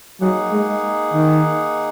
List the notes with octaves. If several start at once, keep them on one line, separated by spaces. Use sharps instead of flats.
F#3 A#3 D#4 G#4 F#5
G#3
D#3